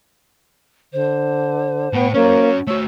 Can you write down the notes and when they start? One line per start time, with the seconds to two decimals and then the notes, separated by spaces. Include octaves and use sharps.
0.93 D3 C5
1.93 A2 B3 G5
2.14 A#3 C#4 F#4 C#5
2.67 A3 F#4 C#5 E6